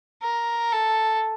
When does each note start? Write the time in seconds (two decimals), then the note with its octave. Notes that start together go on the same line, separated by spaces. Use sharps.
0.22 A#4
0.72 A4